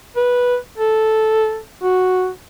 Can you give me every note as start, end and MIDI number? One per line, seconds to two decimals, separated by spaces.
0.16 0.57 71
0.78 1.59 69
1.83 2.29 66